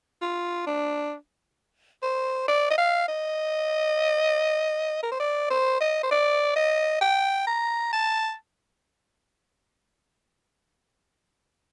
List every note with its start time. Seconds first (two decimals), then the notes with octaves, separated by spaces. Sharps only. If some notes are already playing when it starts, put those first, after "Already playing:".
0.22 F4
0.67 D4
2.03 C5
2.48 D5
2.71 D#5
2.78 F5
3.08 D#5
5.03 A#4
5.12 C5
5.20 D5
5.50 C5
5.81 D#5
6.03 C5
6.11 D5
6.56 D#5
7.01 G5
7.47 A#5
7.93 A5